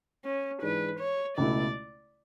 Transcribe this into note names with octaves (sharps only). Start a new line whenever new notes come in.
C#4
G#2 E3 G#3 D4 B4
C#5
C#2 B2 A3 E4 D5